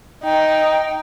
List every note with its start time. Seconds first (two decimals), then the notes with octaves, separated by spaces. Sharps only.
0.24 D#4 G5